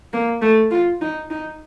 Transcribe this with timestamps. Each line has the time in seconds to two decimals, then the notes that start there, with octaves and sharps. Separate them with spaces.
0.13 A#3
0.42 A3
0.71 F4
1.01 D#4
1.30 D#4